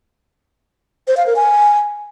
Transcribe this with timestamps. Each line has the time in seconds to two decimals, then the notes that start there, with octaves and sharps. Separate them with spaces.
1.08 C5
1.17 F5
1.26 A#4
1.36 G#5